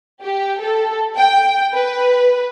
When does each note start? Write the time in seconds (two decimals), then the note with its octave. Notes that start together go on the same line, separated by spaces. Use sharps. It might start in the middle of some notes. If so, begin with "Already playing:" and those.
0.23 G4
0.61 A4
1.17 G5
1.73 B4